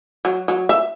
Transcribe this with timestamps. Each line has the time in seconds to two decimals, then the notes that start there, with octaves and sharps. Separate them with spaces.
0.25 F#3
0.48 F#3
0.69 E5